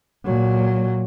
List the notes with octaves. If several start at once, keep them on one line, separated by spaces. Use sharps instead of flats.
A#2 F#3